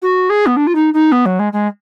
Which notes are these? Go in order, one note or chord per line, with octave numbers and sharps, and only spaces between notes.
F#4
G#4
B3
D4
F4
D#4
D#4
B3
F#3
G#3
G#3